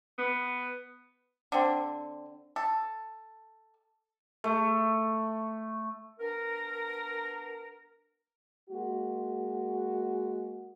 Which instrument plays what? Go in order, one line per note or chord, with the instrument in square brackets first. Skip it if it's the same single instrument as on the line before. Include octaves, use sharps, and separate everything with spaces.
[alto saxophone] B3
[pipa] D3 C4
A4
[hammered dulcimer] A3
[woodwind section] B3 D4 A#4
[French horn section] G#3 A#3 F#4